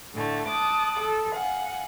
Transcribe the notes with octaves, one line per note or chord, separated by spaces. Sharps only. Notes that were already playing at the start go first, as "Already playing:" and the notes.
A2 D3 A3
A5 D6 D#6 F#6
A4
F5 F#5 G#5